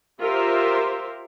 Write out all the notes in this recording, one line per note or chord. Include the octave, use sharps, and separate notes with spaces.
F4 G4 A#4 C5 E5